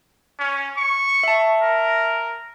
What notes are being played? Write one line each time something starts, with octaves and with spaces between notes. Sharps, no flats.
C#4
C#6
E5 A5
A#4